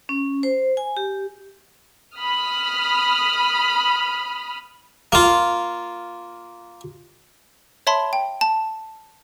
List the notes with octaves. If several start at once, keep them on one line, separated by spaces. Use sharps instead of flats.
C#4
C5
G#5
G4
B5 D#6 F6
A#3 F4
C#5 E5 A5 B5 C6
G5
A5